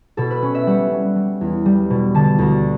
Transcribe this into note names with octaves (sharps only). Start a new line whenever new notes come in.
B2 A4
B4
C#4
E5
G3 F#5
C#4
G3
E2
G3
B2
D3 A5
D2